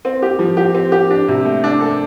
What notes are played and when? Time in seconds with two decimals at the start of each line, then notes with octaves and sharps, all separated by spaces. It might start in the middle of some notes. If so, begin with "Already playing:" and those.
0.05 C4
0.22 G4
0.39 F3
0.57 G4
0.74 C4
0.92 G4
1.10 D4
1.28 C3
1.45 A3
1.64 D4
1.81 A4